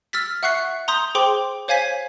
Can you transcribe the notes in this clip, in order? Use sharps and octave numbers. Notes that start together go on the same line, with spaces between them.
E6 F6 A6 B6
E5 F#5 C#6 F#6 C7 C#7
A#5 C6 D#6 G6
G#4 C5 G5 C6 D6
C5 C#5 F5 G#5 G#6 B6